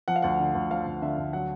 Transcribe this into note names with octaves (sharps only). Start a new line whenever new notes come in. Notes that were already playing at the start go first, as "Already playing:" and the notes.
F3 F#5
F5
D2 F#5
D3
D2
F3 F5
D2
D3 E5
D2
F#3 F#5